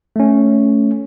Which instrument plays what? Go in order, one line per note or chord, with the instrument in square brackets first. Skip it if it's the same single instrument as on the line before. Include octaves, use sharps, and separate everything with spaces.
[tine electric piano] A3 C#4